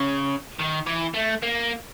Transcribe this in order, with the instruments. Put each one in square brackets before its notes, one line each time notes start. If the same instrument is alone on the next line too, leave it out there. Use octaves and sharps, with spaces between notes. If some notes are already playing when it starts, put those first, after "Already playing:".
Already playing: [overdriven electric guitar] C#3
D#3
E3
A3
A#3